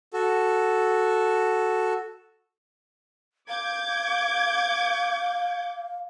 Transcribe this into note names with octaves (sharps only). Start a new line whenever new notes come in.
F#4 A4
F5 D6 G6 G#6